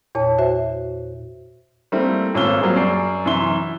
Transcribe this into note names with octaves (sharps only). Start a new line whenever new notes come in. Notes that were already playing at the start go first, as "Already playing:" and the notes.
E2 A#2 C#5 A5
F#4 C5 E5
G3 A3 A#3 C4 E4
G#1 A#2 C#4 E6 F6 G7
F#3 G3 A#3 C4 G#4
F#2 D5 C7
F#2 C3 E3 E5 C6 G7
E4